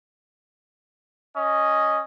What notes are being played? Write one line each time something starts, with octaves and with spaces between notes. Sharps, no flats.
C#4 D#5